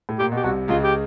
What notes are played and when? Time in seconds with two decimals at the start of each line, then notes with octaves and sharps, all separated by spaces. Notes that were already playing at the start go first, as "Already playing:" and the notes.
0.09 A2
0.18 A#2 G4
0.32 B2 G4
0.43 C2 C3 F#4
0.68 C#2 C#3 F4
0.83 G4